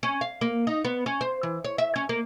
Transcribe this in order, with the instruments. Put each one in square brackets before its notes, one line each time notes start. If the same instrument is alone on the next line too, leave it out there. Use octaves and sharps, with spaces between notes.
[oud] C#4
F5
A#3
D#4
B3
C#4
C5
E3
C#5
E5
C#4
A#3